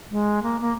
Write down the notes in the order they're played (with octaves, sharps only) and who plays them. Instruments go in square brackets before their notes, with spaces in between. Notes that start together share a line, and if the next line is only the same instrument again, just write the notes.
[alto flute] G#3
A#3
A#3